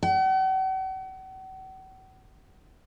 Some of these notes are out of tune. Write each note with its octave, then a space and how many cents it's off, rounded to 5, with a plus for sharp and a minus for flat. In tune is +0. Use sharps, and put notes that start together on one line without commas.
F#5 +45